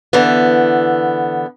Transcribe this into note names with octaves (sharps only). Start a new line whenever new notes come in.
D3 E3 B3